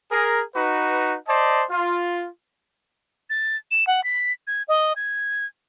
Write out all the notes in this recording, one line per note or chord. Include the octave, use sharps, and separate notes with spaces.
G#4 A#4
D#4 F#4 B4
C5 D5 D#5 A5
F4
A6
E7
F#5
B6
G#6
D#5
G#6